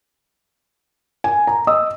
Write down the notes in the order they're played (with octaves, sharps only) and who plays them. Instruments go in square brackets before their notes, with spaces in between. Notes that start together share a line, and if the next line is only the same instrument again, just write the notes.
[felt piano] G#5
A#5
D#5 D#6 E6